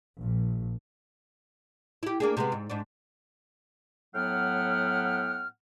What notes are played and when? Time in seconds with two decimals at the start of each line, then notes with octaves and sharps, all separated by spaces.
0.18 A#1
2.03 E4 G4
2.20 A#3 D4 G#4
2.37 C3 G#3 B3
2.52 G#2
2.70 G#2 D4
4.15 A2 F#3 B3 F#5 G5 F6